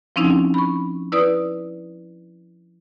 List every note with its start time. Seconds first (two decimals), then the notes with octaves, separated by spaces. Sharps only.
0.16 F3 C4 C#4 D#4 E4
0.54 B5 C#6
1.12 E4 B4 D5 D#6